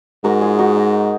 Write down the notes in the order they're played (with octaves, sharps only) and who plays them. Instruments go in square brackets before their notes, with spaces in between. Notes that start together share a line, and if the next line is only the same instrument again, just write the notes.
[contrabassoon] G#2 [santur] F#4 A#4
[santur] F4 G#4
D#4 F#4
D#4